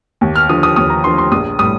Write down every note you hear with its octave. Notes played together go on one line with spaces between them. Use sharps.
D#2
F6
D3 F3 D#6
D#6
D#2 D#6
A#5
D3 F3 C6
C6
A#1 D#6
A2 G3 D#6